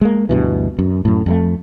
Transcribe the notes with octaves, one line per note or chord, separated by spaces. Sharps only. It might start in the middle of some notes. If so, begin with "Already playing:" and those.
G#3 A#3
D2 G2 B2 E3
F#2
F#2 A2
F2 G3 A3